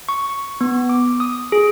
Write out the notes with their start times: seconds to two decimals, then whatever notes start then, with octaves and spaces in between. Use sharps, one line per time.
0.09 C#6
0.61 B3
0.89 D6
1.20 D#6
1.52 G#4